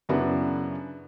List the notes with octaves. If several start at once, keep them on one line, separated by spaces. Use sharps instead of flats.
F#2 C#3 B3 D4 E4 F#4